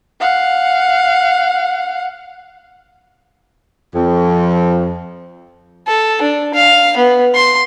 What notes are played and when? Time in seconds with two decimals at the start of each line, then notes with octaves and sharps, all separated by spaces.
0.20 F5 F#5
3.95 F2
5.87 A4
6.22 D4
6.54 F5
6.97 B3
7.35 C6